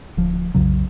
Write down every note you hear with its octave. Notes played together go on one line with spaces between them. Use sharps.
D1 F3
B1 F2 C#3 F#3